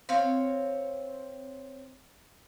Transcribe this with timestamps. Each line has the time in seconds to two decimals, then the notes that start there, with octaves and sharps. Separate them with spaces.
0.09 C4 C#5 F5